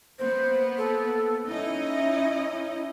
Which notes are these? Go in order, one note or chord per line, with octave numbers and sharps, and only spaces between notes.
A#3 B3 C5
A4
C#4 D#4 E4 D#5